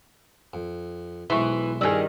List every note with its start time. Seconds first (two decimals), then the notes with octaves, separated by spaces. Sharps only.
0.54 F2
1.30 B1 E3 G#3 E5 C6 C#6
1.81 G2 D#3 G3 G#4 A#5 E6